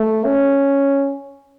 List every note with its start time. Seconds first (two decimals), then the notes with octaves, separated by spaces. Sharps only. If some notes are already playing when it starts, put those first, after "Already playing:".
Already playing: A3
0.25 C#4